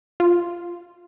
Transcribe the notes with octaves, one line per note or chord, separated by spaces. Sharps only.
F4